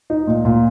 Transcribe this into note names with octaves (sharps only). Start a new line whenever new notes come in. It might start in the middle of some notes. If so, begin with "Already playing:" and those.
D#4
A#2
A#2